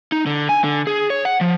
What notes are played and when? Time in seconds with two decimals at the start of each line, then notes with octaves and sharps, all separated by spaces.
0.12 D#4
0.26 D3
0.49 G#5
0.64 D3
0.87 G#4
1.10 C#5
1.25 F#5
1.41 F3